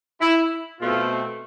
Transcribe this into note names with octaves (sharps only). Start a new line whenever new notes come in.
E4
B2 A3 C4 F4